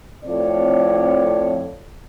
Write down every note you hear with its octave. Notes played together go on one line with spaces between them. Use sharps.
F2 A2 F3 C4 C#5 D5